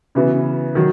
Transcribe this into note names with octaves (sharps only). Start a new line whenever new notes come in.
C#3 E3 B3 F#4
D#3 F#3